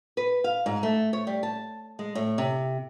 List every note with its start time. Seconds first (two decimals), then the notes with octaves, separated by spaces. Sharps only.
0.17 B4
0.44 F5
0.66 G#2
0.83 A3
1.13 C#5
1.27 G3
1.43 A5
1.99 G#3
2.15 A2
2.38 C3